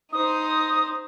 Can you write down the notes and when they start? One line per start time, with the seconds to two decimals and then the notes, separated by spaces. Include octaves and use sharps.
0.13 D#4 C5 D#6